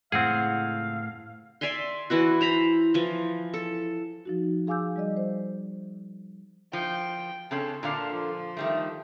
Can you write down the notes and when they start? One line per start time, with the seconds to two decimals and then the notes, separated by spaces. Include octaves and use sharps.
0.12 C#2 A2 C4 G#4 F5 F#5
1.61 D5 E5 G#5 C6
2.10 E3 E4 F#4
2.41 C5 A#5 B5
2.94 E3 F3
3.54 A4
4.25 F3 D#4 F#4
4.67 G#4 F5 G#5 D6 E6 G6
4.96 G3 D5 D#5
5.17 C5
6.73 F3 G5
7.51 C#3 C4 C#4 A4
7.83 A#2 D3 D4 F5
8.13 F3
8.57 D#3 G3 A3